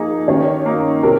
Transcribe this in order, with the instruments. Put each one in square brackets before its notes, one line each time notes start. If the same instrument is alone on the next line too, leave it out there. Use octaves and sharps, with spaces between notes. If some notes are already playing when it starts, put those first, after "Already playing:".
Already playing: [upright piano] F3 A#3 D#4 G#4
[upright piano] D#3 [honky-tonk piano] C#4 C#5
[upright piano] A#3 D#4
[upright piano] C3 [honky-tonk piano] A#4